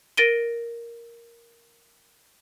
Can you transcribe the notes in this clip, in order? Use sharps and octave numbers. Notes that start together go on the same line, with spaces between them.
A#4 A6 A#6 D7 D#7 G7